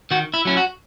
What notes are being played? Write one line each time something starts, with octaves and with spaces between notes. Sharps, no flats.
D#3 F#4
E4
F#3 C#4 E4
F#4